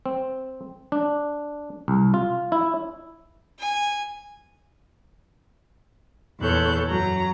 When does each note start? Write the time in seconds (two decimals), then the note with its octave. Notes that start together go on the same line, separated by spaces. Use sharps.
0.06 C4
0.92 D4
1.88 C2
2.14 F4
2.52 E4
3.59 G#5
6.40 E2 A#2 A4 C#5 F#6 G6
6.87 F#2 F#3 A#5